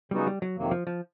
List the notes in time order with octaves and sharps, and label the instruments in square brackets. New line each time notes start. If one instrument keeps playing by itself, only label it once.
[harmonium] C#3 F#3 B3 D#4 F#4 [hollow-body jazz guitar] G3
[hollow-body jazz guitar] G3
F#3
[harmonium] F2 C3 D#3 F#3 A#3
[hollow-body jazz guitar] F3
F3